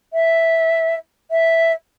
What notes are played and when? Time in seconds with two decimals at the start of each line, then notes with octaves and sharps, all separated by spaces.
0.13 E5
1.31 E5